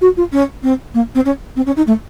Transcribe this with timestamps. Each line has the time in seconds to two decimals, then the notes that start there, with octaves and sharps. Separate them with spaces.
0.01 F#4
0.17 F4
0.33 C#4
0.63 C4
0.94 A#3
1.15 C4
1.25 C#4
1.56 C4
1.66 C#4
1.77 D#4
1.87 A3